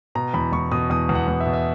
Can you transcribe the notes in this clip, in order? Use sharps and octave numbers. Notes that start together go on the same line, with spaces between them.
B2 A#5
E2 B5
E2 C#6
B2 D#6
E2 D#6
E2
F#5
E2
E5
B2
E5